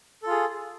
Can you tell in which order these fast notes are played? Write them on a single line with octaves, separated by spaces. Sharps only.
A4 F4 G#4